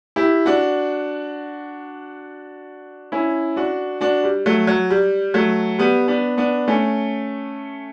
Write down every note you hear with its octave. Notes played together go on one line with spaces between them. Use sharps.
E4 G4
D4 F#4
C#4 E4
D4 F#4
D4 F#4
G3
F#3 A3
F#3
G3
F#3 A3
G3 B3
B3 D4
B3 D4
A3 C#4